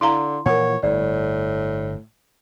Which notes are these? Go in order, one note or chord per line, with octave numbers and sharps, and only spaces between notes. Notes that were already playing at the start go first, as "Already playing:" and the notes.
D3 E4 F5 A#5 C6
A#2 E3 F3 A#4 C#5 F#5
G1 A2 D5